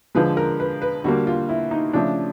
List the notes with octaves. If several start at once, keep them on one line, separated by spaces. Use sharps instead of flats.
D3 F3 G#3 B4
A#4
B4
B4
D3 G3 A#3 F#4
F4
E4
D#4
C#3 F3 A3 D4